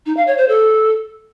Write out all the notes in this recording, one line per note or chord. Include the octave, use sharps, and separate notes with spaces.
D#4
F5
C#5
C5
A4